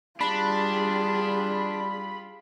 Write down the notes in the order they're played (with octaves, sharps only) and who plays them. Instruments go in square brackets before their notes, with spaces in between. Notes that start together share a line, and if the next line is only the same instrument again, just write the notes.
[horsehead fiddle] G3 G#4 [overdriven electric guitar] D4 [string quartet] F4 [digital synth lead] B5